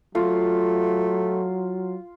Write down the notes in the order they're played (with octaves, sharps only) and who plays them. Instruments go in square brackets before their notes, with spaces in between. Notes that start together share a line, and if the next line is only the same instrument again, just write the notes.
[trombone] F#3 [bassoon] A3 [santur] F4